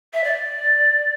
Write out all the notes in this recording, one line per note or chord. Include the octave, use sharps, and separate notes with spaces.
E5
D5